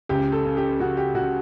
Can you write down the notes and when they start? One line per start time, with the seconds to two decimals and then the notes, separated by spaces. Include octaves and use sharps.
0.09 C#2 G4
0.32 A4
0.45 C#3
0.57 G4
0.80 C#3 F#4
0.97 G4
1.15 C#3 F#4